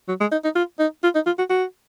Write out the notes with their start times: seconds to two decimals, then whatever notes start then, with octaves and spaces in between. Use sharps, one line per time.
0.08 F#3
0.21 G#3
0.32 D#4
0.44 D#4
0.55 F4
0.79 D#4
1.03 F4
1.15 D#4
1.26 F4
1.38 F#4
1.50 F#4